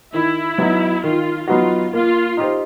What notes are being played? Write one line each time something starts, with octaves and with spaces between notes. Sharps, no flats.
D#3 E4
F#3 B3 D#4 F#4
D#3 F4
F#3 B3 D#4 F4 F#4
A#3 F4
D#4 G4 C5